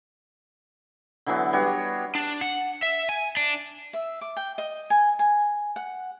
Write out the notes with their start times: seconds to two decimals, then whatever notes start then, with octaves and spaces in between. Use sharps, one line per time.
1.26 D3 E3 F#3 B3
1.53 G3 D4 F#4 C#5
2.15 D4
2.41 F#5
2.83 E5
3.09 G#5
3.37 D4
3.93 E5
4.21 D6
4.37 G5
4.58 D#5
4.90 G#5
5.19 G#5
5.76 F#5